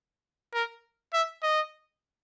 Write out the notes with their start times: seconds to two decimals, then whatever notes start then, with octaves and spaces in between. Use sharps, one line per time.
0.54 A#4
1.13 E5
1.43 D#5